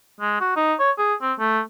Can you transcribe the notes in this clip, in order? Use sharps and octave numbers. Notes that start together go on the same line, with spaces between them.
G#3
F#4
D#4
C#5
G#4
C4
A3